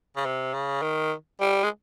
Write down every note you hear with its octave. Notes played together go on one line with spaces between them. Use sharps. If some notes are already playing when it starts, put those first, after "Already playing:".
C#3
C3
C#3
D#3
G3
G#3